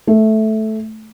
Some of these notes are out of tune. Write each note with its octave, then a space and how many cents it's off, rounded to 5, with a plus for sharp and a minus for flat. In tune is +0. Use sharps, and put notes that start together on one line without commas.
A3 -10